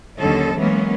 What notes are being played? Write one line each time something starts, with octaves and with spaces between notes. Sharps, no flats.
D#2 D3 F#3 C#4 A4 D#5
E3 F#3 G#3 A#3 B3 C#4